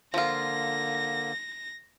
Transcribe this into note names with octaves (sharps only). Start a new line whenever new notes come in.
D3 F3 A#3 F4 A#6